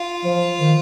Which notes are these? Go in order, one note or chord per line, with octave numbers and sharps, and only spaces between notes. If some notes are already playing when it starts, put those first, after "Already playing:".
Already playing: F4
F3
D#3